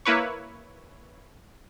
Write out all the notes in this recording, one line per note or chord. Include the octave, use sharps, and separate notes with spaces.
A#3 E4 B4 C#5